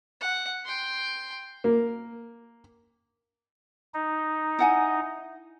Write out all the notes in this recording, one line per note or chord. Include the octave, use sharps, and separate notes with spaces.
F#5
G5 C6
A#3
D#4
E4 F#5 G#5